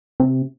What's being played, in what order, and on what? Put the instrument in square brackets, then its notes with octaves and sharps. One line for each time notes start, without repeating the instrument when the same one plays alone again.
[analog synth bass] C3